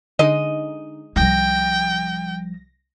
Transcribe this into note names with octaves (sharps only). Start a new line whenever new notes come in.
D3 G#3 D#4 D#5
C2 F3 G3 G5 A#6